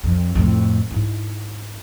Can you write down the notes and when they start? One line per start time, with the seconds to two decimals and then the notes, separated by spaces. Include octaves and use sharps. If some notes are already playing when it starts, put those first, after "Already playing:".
0.04 F2
0.35 F2 A2
0.91 G#2 E4